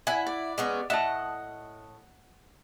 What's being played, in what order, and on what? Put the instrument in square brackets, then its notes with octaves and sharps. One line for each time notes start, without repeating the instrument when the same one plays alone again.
[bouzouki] E4 F#5 [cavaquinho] G#5
[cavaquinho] D5
[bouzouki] G#3 B3 C#4
[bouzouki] A2 D#5 [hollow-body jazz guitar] E5 A5 [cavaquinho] F#5